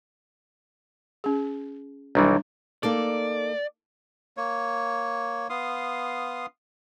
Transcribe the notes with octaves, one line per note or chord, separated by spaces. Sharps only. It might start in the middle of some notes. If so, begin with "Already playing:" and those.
C#4 G#4
B1 D#3 E3 G3 D4
A#3 D#4 A4 D5
A#3 C#5
B3 F5 C6 D#6